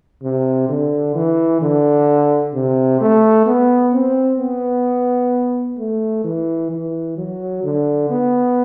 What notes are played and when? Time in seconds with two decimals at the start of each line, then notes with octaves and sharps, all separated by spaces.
0.23 C3
0.69 D3
1.15 E3
1.62 D3
2.54 C3
3.01 A3
3.47 B3
3.93 C4
4.40 B3
5.78 A3
6.25 E3
6.71 E3
7.17 F#3
7.64 D3
8.10 B3